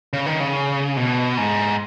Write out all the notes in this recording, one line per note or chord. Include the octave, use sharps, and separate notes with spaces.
C#3
D#3
C#3
B2
G#2